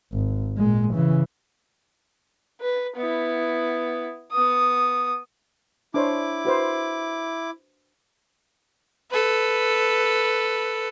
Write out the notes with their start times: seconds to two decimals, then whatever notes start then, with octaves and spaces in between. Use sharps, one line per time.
0.12 G#1
0.57 A#2 G#3
0.93 C#3 E3
2.61 B4
2.96 B3 E4
4.31 B3 D#6
5.94 D4 E4 C5 C#5 D6
6.45 F#4 B4 C5
9.11 A4 B4